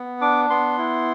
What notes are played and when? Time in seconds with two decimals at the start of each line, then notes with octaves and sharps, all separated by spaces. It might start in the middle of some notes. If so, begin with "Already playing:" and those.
Already playing: B3
0.21 D4 D6
0.50 B3 C6
0.78 E4